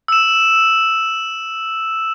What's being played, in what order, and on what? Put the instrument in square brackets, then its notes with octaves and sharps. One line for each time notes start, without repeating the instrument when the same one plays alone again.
[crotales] E6 E7